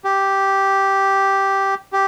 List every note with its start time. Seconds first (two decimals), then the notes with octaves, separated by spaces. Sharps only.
0.04 G4
1.93 G4